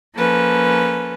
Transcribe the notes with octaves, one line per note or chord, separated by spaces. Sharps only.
F3 A#3 C#4 A4 B4